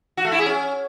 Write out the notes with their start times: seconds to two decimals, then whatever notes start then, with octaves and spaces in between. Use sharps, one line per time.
0.17 F#4
0.25 A3
0.32 E4
0.39 G#4
0.46 C#4